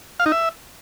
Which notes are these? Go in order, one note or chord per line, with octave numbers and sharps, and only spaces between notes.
F5
D#4
E5